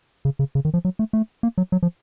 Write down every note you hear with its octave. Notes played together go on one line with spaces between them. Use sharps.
C#3
C#3
C#3
D#3
F3
F#3
A3
A3
A#3
F#3
F#3
F3